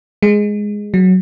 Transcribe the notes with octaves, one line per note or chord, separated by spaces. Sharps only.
G#3
F#3